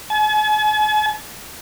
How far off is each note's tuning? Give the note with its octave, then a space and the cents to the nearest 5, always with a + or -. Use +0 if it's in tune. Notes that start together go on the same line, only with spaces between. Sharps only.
G#5 +45